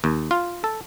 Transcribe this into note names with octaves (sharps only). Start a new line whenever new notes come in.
D#2
F4
A4